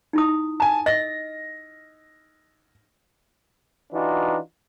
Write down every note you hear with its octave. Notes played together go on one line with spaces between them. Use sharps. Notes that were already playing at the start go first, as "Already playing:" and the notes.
D#4 E4 D#6
G#5 A5
D#5 A#6
E3 D4 D#4 F4 F#4